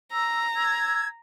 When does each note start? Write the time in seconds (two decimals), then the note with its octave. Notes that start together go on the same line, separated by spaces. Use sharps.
0.12 A#5 E6
0.56 E6 G#6